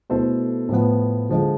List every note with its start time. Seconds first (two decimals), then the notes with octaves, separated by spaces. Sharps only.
0.10 B2 A3 E4 A4 C5
0.69 A2 F3 B3
1.30 D3 F3 G#3